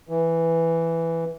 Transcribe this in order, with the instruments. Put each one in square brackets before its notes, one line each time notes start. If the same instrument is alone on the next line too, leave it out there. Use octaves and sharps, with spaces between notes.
[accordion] E3